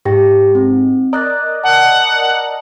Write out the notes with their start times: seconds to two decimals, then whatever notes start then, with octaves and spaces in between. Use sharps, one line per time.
0.05 G#2 G4 G5 A#6
0.55 C4
1.13 A#4 D5 D#5 A#5 F#6 A6
1.64 F#5 A5